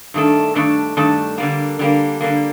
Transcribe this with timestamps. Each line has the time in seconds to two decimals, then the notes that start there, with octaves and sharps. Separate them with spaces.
0.14 G2 D#3 A3 D4 A4
0.55 G2 D#3 A3 D4 A4
0.97 G2 D#3 A3 D4 A4
1.38 D3 G3 A#3
1.79 D3 G3 A#3
2.20 D3 G3 A#3